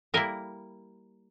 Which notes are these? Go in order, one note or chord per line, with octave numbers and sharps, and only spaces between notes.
G3 A#3 E4 A#4